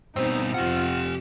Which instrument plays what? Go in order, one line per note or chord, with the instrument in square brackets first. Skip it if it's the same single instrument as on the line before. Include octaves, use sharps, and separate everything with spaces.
[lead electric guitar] G2 B2 [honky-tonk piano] C4 [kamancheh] D#4
[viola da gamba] F2 C3 [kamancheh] F4 [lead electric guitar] G4 F#5